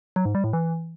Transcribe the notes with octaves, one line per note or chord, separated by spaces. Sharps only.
F#3
G#2
G3
A2
E3